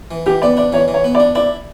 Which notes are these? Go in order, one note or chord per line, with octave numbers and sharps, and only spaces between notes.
E3
E3 G4
B3 D5
D4 D5
E3 C#5
E3
C#5
B3
D5
D4
E4 D5